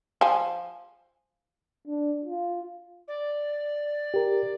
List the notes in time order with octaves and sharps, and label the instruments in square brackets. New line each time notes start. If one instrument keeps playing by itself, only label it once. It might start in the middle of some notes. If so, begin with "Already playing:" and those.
[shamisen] F3 G#5
[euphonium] D4
F4
[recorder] D5
[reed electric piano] G4 A#4